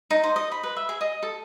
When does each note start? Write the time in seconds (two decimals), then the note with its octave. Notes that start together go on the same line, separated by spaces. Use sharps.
0.11 D#4
0.24 C5
0.36 D#5
0.52 B5
0.63 B4
0.77 E5
0.89 G#4
1.01 D#5
1.23 A4